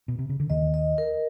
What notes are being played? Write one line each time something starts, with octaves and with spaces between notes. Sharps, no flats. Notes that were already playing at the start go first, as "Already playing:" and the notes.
B2
C3
C#3
D3
D#2 D#3 D#5
D#5
A#4